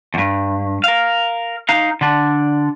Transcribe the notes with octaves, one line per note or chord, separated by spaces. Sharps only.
E2 G2
A#4 F5
D#4 F5
D3 D4